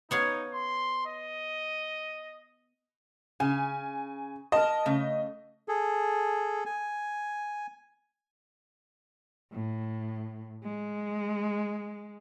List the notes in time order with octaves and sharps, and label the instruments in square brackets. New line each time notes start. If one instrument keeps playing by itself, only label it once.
[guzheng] B3 C#5 F5 [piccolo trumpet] D#4
[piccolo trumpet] C6
D#5
[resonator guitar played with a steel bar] C#3 [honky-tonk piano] G#5
[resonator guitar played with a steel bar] A#4 A5 [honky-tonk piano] D#5
[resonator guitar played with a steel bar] C#3 A3
[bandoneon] G#4 A4
G#5
[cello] A2
G#3